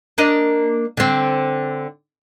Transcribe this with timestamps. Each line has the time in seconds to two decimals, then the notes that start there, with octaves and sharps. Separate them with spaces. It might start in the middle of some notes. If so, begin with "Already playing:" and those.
0.18 A#3 D4 D#5
0.97 D3 C4